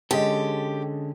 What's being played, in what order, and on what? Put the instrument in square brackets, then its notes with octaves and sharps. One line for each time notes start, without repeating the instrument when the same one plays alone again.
[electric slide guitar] D3 C#4 A4 [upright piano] G#3 D#5 [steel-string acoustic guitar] G4